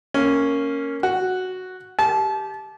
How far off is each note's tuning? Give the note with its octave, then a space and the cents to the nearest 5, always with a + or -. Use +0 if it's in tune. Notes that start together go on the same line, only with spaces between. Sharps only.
A#3 -5 C#4 +0
F#4 +0 F#5 +0
G4 +0 A5 -30